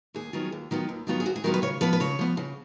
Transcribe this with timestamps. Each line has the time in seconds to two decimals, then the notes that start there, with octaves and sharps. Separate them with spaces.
0.14 D#2 G#4
0.33 D#3 F#3 B3 F4
0.52 D#2
0.71 D#3 F#3 B3 F4
0.89 D#2
1.07 D#3 F#3 B3 F4
1.20 G#4
1.25 D#2 F#4
1.36 G#4
1.44 D#3 F#3 B3 F4 A#4
1.54 B4
1.62 C#3 C#5
1.81 F3 B3 B4
1.93 B4
2.00 C#3 C#5
2.19 F3 B3
2.37 C#3